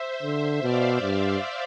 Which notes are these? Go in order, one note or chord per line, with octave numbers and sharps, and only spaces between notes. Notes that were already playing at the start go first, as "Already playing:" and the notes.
Already playing: C5 E5
D3
B2 D5 F5
G2 C5 E5